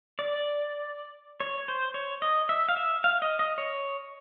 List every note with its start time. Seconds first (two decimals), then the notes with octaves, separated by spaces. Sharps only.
0.19 D5
1.40 C#5
1.68 C5
1.94 C#5
2.22 D#5
2.49 E5
2.69 F5
2.77 E5
3.04 F5
3.22 D#5
3.39 D#5
3.58 C#5